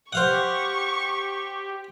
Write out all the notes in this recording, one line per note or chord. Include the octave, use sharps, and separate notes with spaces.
G4 C5 F5 F#5 C#6